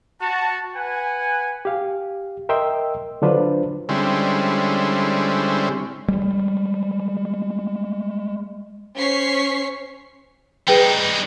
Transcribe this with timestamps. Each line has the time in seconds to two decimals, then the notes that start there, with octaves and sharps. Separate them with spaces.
0.21 F#4 A5
0.76 B4 F#5 G#5
1.65 G4 F5
2.49 A#4 D#5 E5 G5 C6 E6
3.22 D3 F#3 D4 F4 B4 C5
3.89 D3 G3 G#3 C4 C#4 E4
6.08 G3 G#3
8.96 C#4 C5 C#5 C#6 B6 C7
10.68 G3 D#4 G#4 B4 G5